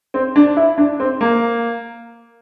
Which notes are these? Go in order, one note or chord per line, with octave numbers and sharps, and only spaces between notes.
C4
D4
E4
D4
C4
A#3